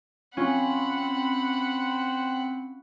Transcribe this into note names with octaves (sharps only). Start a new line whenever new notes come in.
C4 C#4 F4 F#5 B5